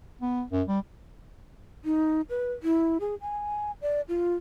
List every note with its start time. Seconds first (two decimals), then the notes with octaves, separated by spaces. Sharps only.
0.21 B3
0.52 F#2
0.68 G3
1.85 D#4
2.29 B4
2.63 E4
3.00 G#4
3.21 G#5
3.82 D5
4.08 F4